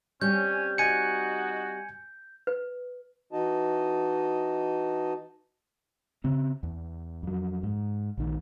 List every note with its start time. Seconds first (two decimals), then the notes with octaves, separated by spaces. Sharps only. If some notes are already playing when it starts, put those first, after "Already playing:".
0.21 G3 C4 C#4 G6
0.78 D#4 F#4 G#5 C#7
2.47 B4
3.32 E3 D#4 F#4 D#5 A5
6.24 C#3 C4
6.63 E2
7.23 F2 F#3
7.63 G#2
8.18 A#1 D#3